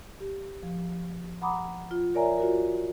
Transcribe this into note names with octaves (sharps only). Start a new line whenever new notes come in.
G4
F3
F#5 A#5 B5 D6 D#6
F4
A#4 C#5 D5 E5 G#5 A#5
F4 F#4 A#4